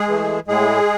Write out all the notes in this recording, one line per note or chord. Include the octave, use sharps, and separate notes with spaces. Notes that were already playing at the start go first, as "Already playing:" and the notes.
Already playing: G#3 G#4
E3 A3
A2 G#3 G#4